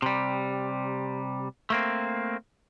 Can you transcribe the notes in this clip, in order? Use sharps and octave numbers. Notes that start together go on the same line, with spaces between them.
C3 G3
A3 A#3 C4